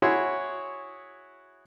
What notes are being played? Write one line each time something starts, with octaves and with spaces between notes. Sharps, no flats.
E4 F#4 G#4 C#5 C6 C#6